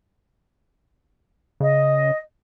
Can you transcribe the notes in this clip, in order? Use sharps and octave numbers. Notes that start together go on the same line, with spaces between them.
C#3 D#5